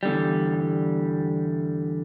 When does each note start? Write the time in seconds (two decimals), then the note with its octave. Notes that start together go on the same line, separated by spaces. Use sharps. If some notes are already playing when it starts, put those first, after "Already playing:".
0.03 E2 D3 G3